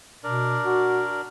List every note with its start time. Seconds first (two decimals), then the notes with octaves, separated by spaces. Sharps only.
0.24 B2 D4 A#4 D5
0.65 F#4